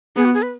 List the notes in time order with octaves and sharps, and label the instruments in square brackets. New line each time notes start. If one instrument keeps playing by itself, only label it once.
[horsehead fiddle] B3 [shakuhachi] G#4
[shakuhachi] F#4
G#4
B4